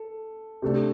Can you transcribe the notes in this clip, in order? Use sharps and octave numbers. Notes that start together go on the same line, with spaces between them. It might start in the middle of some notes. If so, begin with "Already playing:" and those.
Already playing: A4
C3 A3 D4 A4